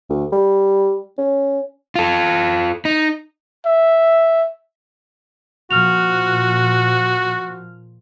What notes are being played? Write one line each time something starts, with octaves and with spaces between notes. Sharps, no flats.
D2
G3
C#4
F4 A4
D#4
E5
A#2 F3 F#4 F6 F7